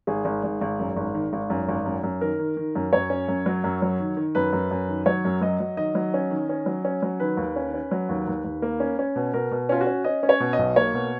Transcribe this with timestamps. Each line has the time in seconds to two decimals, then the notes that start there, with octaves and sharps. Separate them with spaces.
0.07 G#1 G#4
0.25 G#1
0.44 G#1
0.61 G#1
0.80 F#2
0.97 G#1
1.15 D#3
1.33 G#1
1.50 F#2
1.69 G#1
1.86 F#2
2.04 F#2
2.21 D#3 A#4
2.39 D#3
2.57 D#3
2.75 F#2
2.93 F#2 C#5
3.10 C#4
3.28 F#2
3.46 F#3
3.64 F#2
3.82 F#3
4.00 D#3
4.17 D#3
4.35 F#2 B4
4.53 F#2
4.71 F#2
4.89 D#3
5.06 F#3 C#5
5.25 F#2
5.41 F#3 D#5
5.60 F#3
5.77 D#3 D#5
5.95 F#3
6.14 C#4
6.31 D#3
6.49 C#4
6.66 F#3
6.85 C#4
7.03 F#3
7.20 D#3 B4
7.37 D#2
7.56 C#4
7.74 C#4
7.91 F#3
8.09 D#2
8.28 D#2
8.45 D#2
8.62 A#3
8.80 C#4
8.99 C#4
9.16 B2
9.34 B2 A#4
9.51 B2
9.69 C#4 F4
9.81 F#4
9.87 C#4
10.04 C#4 D#5
10.23 C#4
10.29 C#5
10.40 B2
10.53 D#5
10.58 B1
10.76 A#3 C#5
10.94 B2